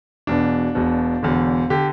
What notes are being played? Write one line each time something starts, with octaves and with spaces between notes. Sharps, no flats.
E1 E2 B2 D4
E1 E2 B2
E1 E2 D3
D3 G4